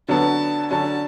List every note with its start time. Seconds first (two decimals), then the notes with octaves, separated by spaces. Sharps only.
0.08 D3 F#3 B3 A5
0.70 D3 F#3 C#4 A5